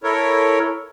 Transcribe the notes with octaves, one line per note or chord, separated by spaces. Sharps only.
E4 A4 A#4 C#5